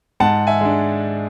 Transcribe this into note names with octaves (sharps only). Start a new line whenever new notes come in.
G#2 F#5 A5
E5 G#5
G#3 D4